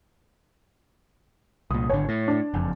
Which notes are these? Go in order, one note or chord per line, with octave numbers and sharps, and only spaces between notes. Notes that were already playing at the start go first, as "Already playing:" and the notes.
C2 A#2 D#6
G#1 D3 C#5
A2
D4
F#1 F2